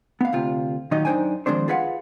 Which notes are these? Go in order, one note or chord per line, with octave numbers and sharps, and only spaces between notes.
B3 F5
D2 C3 F4
A#2 D#3 F#3 C#4 D#4 D#5
F#2 D4 D#4 C5 G5 G#5
D#3 F3 G#3 C4 D4 C5
F4 G#4 B4 F5 F#5